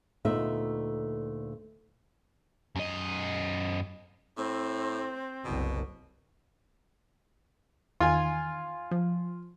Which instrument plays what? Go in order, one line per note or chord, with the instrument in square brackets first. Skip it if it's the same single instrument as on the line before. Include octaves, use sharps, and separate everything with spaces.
[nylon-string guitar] D2 A#2 A3 B3 D#4 E5
[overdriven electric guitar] F#2 D#5
[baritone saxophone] A2 [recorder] C4
[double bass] F#1 C2 [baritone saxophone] B2
[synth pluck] E2 D#3 [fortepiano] F4 G#5
[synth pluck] F3